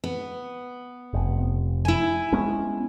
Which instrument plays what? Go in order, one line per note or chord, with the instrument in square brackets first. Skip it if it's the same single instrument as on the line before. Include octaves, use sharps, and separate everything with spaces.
[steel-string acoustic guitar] B3
[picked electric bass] F1
[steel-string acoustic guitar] E4 G#5
[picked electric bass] G#3 B3 C#4